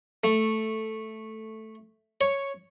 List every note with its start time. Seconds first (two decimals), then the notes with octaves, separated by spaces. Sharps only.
0.24 A3
2.21 C#5